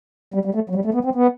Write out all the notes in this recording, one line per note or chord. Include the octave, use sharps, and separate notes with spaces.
G3
G3
A3
F#3
G3
A3
B3
C4
B3